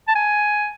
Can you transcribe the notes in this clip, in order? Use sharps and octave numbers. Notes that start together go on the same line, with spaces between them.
A5
G#5